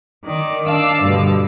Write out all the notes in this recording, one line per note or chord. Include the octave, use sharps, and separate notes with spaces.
D#3 D5
D4 D5 F5 A5 E6
G2 B2 D3